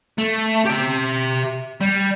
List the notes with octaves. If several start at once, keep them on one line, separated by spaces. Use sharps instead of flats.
A3
G4 E5
G3